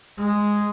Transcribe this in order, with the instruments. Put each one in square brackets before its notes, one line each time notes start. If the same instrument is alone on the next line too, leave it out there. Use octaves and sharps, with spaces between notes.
[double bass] G#3